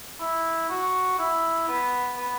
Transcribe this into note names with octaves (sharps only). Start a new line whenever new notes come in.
E4
F#4
E4
B3
B3